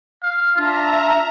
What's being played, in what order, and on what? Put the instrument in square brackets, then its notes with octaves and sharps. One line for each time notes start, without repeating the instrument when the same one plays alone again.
[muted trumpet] F5
[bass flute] D4 [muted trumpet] F4 [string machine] E5 A#5